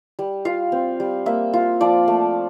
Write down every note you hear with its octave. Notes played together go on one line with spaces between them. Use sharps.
G3
F4 F5
C4
G3
A#3 E5
F4
F3 D5
A3